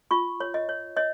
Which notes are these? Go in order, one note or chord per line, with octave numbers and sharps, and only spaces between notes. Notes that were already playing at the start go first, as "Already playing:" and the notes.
F4 C#6
C#5
D#5
C#5
C#5 D#5